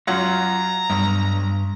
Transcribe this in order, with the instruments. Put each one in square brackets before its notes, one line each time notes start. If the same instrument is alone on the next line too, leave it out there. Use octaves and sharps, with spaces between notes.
[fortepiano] F#2 F#3 F#5 [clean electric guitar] F4 [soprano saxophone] A#5
[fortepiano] B1 [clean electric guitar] G2